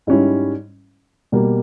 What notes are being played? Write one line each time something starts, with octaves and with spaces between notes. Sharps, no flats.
G#2 G3 C#4 E4
B2 G3 A#3